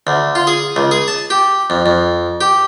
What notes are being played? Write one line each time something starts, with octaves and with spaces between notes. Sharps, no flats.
D2
F4
G#4
C#2
G#4
A5
G4
F2
F2
G4